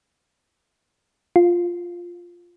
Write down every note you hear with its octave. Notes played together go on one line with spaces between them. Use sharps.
F4